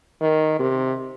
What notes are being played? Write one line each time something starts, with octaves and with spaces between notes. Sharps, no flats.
D#3
C3